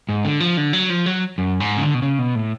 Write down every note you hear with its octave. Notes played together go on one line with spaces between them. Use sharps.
G#2
D3
F3
D3
F#3
F3
F#3
F#2
G#2
C#3
D3
B2
C#3
B2
A2